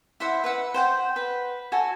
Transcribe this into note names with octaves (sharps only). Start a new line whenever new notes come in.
E4 C5 E5 F#5
B4 E5 F#5
C5 F#5 G5
B4
F#4 A4 G#5